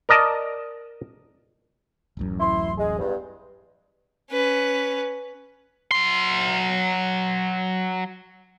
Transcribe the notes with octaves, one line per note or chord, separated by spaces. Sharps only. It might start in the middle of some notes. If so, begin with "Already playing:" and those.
A#4 D5 D#5 A5
D1 A1 F#2
E4 C6
G#3 G#4
E2 G2
C#4 B4
F#3 C6